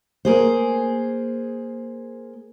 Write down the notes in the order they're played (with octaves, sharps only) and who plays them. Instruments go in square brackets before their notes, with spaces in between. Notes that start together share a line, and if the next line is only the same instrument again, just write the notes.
[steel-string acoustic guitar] A#3 G#4 C5